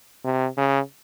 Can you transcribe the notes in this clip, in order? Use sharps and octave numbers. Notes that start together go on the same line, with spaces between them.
C3
C#3